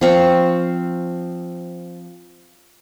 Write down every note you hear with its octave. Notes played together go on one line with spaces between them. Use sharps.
F3 C4 C#6